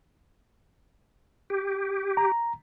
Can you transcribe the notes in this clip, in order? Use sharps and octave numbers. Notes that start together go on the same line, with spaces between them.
G4
A#5